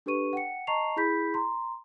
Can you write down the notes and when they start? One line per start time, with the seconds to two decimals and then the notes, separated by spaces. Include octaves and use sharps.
0.06 D4 G4 A4 B4 C#6 D#7
0.33 F#5 G5 C#7
0.67 D#5 A5 A#5 C#6 C7 F7
0.96 E4 G#4 B5 G6 B6
1.34 A#5 C6